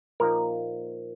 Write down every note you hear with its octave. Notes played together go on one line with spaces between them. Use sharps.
A#2 F3 A#3 D#4 A#4